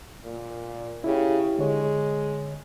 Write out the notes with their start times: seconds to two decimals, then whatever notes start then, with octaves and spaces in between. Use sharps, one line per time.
0.24 A#2
1.04 C#3 E4 G4
1.59 D3 G#3 C#5